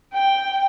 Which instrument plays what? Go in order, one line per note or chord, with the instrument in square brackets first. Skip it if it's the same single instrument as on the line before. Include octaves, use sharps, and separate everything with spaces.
[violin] G5